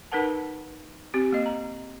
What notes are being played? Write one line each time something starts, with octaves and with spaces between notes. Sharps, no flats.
D#4 A#4 B4 F#5 A5
C4 G4
A#3 D#5
A#5